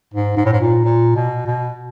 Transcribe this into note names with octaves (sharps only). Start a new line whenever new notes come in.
G#2
G#2
A2
G#2
A#2
A#2
B2
B2